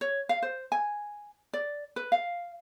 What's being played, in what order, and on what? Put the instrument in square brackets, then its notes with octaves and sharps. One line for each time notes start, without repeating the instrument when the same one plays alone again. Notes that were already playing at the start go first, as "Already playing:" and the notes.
[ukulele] C#5
F5
C5
G#5
D5
B4
F5